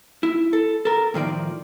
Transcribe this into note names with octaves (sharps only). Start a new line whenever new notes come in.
E4
A4
A4 A#4
A2 D#3 F3 D5